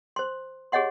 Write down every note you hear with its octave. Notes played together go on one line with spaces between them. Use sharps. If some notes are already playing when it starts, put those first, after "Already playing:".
C5 C6
G4 G#4 C#5 D#5 F#5 C6